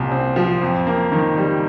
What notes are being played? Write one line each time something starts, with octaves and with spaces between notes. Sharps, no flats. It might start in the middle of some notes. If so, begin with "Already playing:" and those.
Already playing: C2 A#2
C4
F3
F2
A#3
D#3
G3